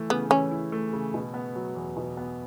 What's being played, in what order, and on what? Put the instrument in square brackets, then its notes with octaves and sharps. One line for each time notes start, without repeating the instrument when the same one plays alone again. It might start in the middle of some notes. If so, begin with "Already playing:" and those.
Already playing: [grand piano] E3 A3 E4
[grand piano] C#3 [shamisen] B3
[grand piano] E3 [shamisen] C#4
[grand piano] E4
A3
C#3
B2
B3
F#3
E2
B2
B3